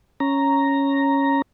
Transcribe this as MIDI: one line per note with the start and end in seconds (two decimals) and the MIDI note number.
0.20 1.42 61
0.20 1.42 82